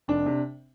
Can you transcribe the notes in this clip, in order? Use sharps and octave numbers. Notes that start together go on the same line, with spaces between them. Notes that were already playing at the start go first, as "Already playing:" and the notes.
F1 D4
C3